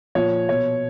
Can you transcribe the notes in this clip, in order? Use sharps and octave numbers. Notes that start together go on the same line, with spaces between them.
A#2 F3 C#5
B2 C#5